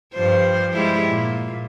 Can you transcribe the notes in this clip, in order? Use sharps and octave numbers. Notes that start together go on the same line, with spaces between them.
G2 F3 C5
G3 G#3 E4
A#2